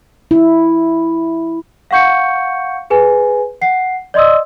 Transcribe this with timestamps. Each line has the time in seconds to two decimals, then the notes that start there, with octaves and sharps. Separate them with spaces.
0.31 E4
1.91 F5 F#5 C#6 G6 C#7
2.90 G#4 B4 G#5
3.62 F#5 C7
4.14 D5 D#5 C6 D#6 E6